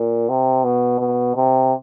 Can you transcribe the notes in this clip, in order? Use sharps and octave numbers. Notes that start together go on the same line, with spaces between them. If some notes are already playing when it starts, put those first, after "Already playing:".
Already playing: A#2
C3
B2
B2
C3